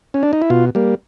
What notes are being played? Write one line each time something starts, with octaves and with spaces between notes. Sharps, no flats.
C#4
D4
D#4
E4
B2 F4
G3 A#3